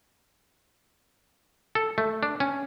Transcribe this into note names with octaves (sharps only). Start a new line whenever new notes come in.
A4
A3
D4
C#4